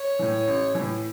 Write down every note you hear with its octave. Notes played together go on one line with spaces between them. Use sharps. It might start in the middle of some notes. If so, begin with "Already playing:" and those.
Already playing: C#5
A2 E3
A1
A2 E3